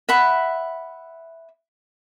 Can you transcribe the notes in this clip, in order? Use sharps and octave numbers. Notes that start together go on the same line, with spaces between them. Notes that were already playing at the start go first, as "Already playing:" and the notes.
E5 F#5 B5